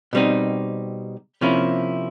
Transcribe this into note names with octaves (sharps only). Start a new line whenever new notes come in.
B2 G3 C4 D#4
C3 F3 A#3 C#4 E4